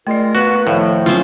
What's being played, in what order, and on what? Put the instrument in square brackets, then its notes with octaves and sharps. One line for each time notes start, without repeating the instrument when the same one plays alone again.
[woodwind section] G#3 F4 A#4 [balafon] A3 D5
[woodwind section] A#3 B3 B4 [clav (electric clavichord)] F#4
[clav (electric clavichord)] A2 [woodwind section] D#3 F3 [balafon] F5
[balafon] F#3 [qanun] C4 C#4 F4